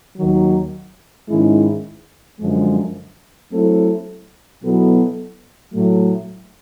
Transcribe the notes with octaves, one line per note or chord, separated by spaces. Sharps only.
D#2 D#3 F#3
G#2 D#3 G#3 C#4 E4
F#2 D3 F3 G#3
F#3 A3 C4 E4 A4
B2 F#3 B3 E4 A4
A2 F#3 A3